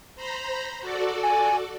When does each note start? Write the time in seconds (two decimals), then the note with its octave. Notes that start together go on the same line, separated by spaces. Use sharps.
0.15 C5 A#5 B5
0.80 F#4 A4 D5
1.23 G#5